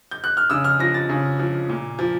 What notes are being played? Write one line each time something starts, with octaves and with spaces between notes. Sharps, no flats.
G6
F#6
F6
C#3 E6
F6
F3 A#6
A6
C#3
F3
A#2
F3